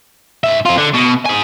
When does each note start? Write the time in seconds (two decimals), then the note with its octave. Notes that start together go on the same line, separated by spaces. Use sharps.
0.44 G#2 E5
0.66 C4 F4
0.78 D3
0.94 B2
1.26 D#4 G#5